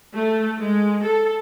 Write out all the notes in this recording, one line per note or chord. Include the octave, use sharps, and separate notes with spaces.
A3
G#3
A4